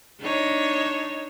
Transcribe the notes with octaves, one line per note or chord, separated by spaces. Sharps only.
D4 D#4 C#5